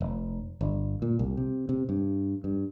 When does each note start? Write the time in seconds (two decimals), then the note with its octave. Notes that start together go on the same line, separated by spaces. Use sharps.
0.01 F1
0.61 G1
1.02 A#2
1.19 C2
1.37 C3
1.69 C3
1.89 G2
2.44 G2